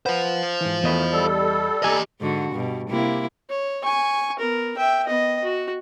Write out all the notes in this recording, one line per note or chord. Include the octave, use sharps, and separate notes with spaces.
B4 C5 F5 F#5
G#2 E3
E2 D#3 A3 D#5 B5
G3 A4
G4 D5 D#5 G#5 A#5
G#2 D3 F#4
G2 B2
C3 A#3 E4
C#5
G#5 C#6
B3 A#4
E5 G5
B3 D#5
F#4